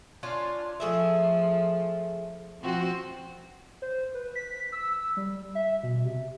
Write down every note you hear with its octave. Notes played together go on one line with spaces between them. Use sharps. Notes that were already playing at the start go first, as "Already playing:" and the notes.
C#4 D4 F4
F3 A3 G#4 E5
F3 C4 F#4
C5
B4
B6
E6
E6
G3
E5
B2
C3